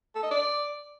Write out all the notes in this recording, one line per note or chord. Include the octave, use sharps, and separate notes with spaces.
A4
D#5
D5